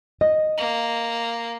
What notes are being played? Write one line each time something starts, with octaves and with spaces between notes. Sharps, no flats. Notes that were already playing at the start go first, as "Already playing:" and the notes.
D#5
A#3